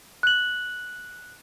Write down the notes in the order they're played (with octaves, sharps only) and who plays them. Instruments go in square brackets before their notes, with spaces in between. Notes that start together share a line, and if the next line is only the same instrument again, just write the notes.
[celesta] F#6 F#7